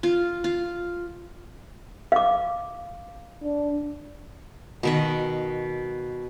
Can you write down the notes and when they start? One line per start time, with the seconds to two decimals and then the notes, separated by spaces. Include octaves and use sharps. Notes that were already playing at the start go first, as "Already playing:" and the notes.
0.03 F4
0.44 F4
2.12 F5 D6
3.43 D4
4.83 B2 D#3 B4